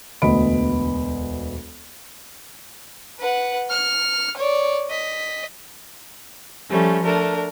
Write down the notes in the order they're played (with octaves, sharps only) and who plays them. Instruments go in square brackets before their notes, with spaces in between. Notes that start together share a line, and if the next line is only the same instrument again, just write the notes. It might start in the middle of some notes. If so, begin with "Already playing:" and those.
[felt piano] E1 D2 B3 D#5 B5 D7
[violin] B4 F#5
F6 C#7
C#5 D5
D#5 B6
[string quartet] F3 G3 A3 C#4
A3 D4 A#4